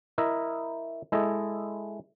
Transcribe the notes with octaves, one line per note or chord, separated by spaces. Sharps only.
E4 A#4 D#5 E5
G#3 E4 A4 D#5